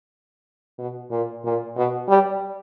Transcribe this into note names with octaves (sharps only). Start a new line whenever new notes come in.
B2
A#2
A#2
B2
G3